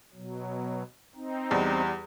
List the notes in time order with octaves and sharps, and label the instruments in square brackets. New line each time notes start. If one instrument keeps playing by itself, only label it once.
[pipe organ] B2 F#3
C4 D#4
[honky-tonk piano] E2 G3